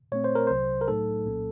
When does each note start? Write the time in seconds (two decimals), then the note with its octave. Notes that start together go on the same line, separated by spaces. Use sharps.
0.12 A#2 A3 C4 C#5
0.24 C5
0.35 A#4
0.47 C2 C3 F#3 C5
0.81 A#4
0.88 A2 F#3 A3 D#4 A4
1.26 C2 A#2 F#3 A#3 C#4